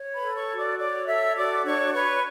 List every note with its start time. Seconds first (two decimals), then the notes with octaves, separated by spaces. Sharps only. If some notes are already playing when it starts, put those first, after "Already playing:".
Already playing: C#5
0.14 B4 B5
0.21 A4
0.36 C#5 C#6
0.51 F#4
0.57 D5 D6
0.78 C#5 D5 D6
1.07 A4 E5 E6
1.36 F#4 D5 D6
1.64 D4 C#5 C#6
1.93 B4 C#5 C#6